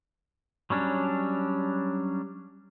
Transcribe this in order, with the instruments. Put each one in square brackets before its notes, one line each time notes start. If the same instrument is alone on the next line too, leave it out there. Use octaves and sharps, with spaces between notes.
[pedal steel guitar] F#3 G3 C#4 D4